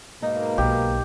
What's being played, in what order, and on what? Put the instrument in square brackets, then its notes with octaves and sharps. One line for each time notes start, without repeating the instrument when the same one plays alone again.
[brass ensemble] G#2 B2 A#3 [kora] D#4
[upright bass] B1 [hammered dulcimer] G4